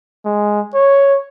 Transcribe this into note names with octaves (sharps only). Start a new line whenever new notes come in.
G#3
C#5